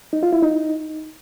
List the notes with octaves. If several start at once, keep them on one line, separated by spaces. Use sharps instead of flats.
D#4
F4
E4
D#4